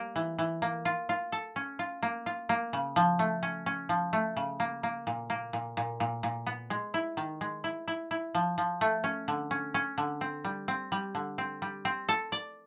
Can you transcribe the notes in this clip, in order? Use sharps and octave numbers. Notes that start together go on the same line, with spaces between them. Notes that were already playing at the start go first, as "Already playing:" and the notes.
Already playing: G3 A#3
E3
E3
A#3
F4
F4
A4
C#4
F4
A#3
F4
A#3
C#3
F3
A3
C#4
C#4
F3
A3
C#3
A#3
A#3
A#2
A#3
A#2
A#2
A#2
A#2
B3
G#3
E4
D#3
G#3
E4
E4
E4
F3
F3
A3
C#4
D3
C#4
C#4
D3
C4
G3
C4
G3
D3
C4
G3
C4
A4
D5